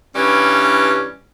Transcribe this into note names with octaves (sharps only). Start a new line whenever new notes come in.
G2 E3 G3 C#4